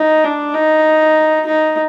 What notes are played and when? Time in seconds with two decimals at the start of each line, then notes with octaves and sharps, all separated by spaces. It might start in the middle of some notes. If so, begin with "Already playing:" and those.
Already playing: D#4
0.24 D4
0.54 D#4
1.46 D#4